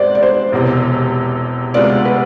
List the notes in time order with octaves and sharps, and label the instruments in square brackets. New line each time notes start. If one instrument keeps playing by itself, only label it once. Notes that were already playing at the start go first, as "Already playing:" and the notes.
Already playing: [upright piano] G#2 G#3 B3 [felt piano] C5 D5
[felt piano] D5
C5
[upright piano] E1 E2 C3
[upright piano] D2 C3 G#3 B3 F4 [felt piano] D5
[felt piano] B4